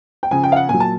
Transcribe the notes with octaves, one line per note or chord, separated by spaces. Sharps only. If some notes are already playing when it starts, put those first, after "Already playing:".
G5
C#3 F3 G#5
G5
F5
F#5
A#2 F#3 G#5
A5